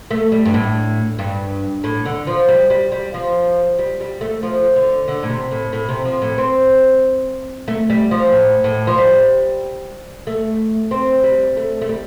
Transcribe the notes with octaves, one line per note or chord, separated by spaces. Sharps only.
A3
G3
G2
A2
G2
A2
D3
F3
G3
G3
G3
F3
G3
G3
A3
F3
D3
D3
A2
C3
A2
A2
C3
F3
A2
C4
A3
G3
F3
A2
A2
F3
G3
A3
C4
G3
A3
A3
G3